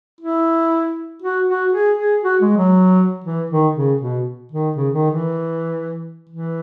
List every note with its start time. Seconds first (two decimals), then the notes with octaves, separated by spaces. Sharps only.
0.21 E4
1.22 F#4
1.47 F#4
1.73 G#4
1.97 G#4
2.24 F#4
2.41 G#3
2.57 F#3
3.24 E3
3.50 D#3
3.76 C#3
4.01 B2
4.52 D#3
4.76 C#3
4.94 D#3
5.10 E3
6.29 E3